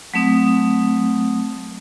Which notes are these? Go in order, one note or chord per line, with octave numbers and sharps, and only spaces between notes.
F#3 A3 C4 D#6